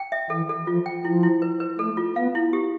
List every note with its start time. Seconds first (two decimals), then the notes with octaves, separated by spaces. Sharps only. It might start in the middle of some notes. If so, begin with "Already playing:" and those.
Already playing: G5
0.12 E5
0.30 E3 A4
0.49 A4
0.67 F3 F4
0.86 G5
1.05 F3 E4
1.23 E4
1.42 B4
1.60 B4
1.79 A3 A4
1.97 F4
2.16 B3 F5
2.35 E4
2.53 G4